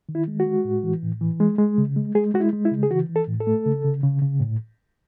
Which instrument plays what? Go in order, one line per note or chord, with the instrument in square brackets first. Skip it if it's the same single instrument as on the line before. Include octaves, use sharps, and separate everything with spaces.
[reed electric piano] D#3
E4
G#3
F#4
G#3
A2
E3
A2
E3
G#3
G#3
C#3
G#3
G#3 G#4
G#3 F#4
E4
G#3
E4
C#3
G#4
E3 F#4
E3
A4
A2
A4
A3
C#3
C#3
C#3
C#3
A2